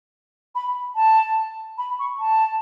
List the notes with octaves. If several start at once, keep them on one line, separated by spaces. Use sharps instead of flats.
B5
A5
B5
C#6
A5